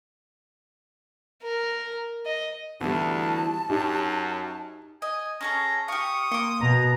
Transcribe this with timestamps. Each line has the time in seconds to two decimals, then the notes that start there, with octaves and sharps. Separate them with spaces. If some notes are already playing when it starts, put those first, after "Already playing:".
1.43 A#4
2.26 D#5
2.81 D2 E3 G3 B3 A5
3.70 F#2 D#4 G4
5.02 D#5 G#5
5.41 C#4 G#4 A4 A#5
5.88 G4 F5 C#6 D#6
6.32 A#3 C6 D6
6.61 B2 A#5